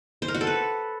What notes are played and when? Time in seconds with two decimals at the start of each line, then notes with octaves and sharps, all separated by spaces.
0.22 C5
0.28 A#4
0.35 F#4
0.41 A4
0.47 B4